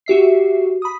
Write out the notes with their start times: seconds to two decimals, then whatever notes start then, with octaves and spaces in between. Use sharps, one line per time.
0.06 F#4 G4 E5 C7
0.82 B5 D#6